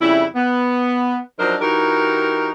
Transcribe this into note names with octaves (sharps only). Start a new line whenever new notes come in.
F2 C#3 G3 E4
B3
F3 F#3 D4 D#4 A#4 C5
E3 D#4 F#4 G4 A#4